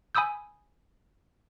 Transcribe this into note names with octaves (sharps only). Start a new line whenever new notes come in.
G#5 B5 D#6 E6 G6